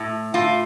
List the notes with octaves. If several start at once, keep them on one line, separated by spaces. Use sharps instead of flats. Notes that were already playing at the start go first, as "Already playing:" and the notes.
Already playing: A2
A2 F4